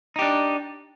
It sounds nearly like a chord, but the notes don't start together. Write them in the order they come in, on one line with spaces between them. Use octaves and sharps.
D#4 G4 D4